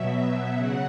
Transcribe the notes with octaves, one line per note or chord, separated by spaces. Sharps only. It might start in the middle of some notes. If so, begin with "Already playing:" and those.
Already playing: B2 F#3 E5
C#3 F#3 F#5